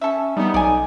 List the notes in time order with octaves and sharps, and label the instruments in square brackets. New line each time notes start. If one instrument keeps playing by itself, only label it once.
[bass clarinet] C#4 [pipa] A4 E5
[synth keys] G3 B3 [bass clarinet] D#4
[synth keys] B1 [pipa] D5 G#5